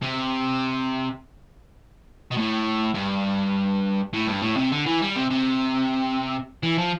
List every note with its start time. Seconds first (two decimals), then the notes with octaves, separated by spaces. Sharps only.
0.02 C3
2.31 B2
2.37 A2
2.95 G2
4.13 A2
4.27 G2
4.42 A2
4.57 C3
4.72 D3
4.86 E3
5.02 G3
5.16 C3
5.30 C3
6.63 E3
6.78 F3